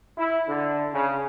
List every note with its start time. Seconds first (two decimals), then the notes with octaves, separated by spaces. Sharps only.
0.18 E4
0.48 D3
0.92 C#3